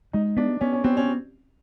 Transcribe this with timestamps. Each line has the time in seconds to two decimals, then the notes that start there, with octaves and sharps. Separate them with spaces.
0.13 G#3 D#4
0.37 B3 D4
0.61 B3 C#4
0.73 C#4
0.84 B3 C4
0.97 C#4